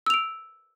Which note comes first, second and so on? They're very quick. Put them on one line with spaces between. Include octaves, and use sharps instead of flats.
E6 F7 D7